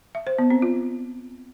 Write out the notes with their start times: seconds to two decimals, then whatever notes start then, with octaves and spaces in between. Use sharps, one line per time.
0.15 E5
0.27 C5
0.39 B3
0.50 C4
0.62 F4